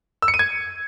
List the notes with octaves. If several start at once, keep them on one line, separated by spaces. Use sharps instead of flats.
E6
C#7
D#7
G#6